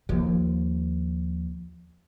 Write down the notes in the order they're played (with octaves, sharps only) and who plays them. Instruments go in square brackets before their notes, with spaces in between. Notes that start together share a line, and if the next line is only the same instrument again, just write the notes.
[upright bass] D#2 F3